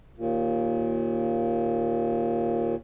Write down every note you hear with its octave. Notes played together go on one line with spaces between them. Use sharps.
D#2 A#2